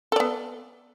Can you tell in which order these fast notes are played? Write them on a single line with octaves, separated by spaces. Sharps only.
A4 D5 B3